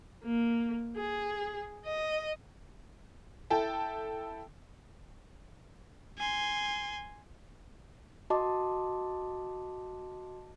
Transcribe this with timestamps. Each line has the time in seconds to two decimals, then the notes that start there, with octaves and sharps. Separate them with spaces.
0.24 A#3
0.96 G#4
1.85 D#5
3.50 E4 A4 G5 A5
6.18 G#5 C6
8.30 F#4 D#5 A5 C6 D6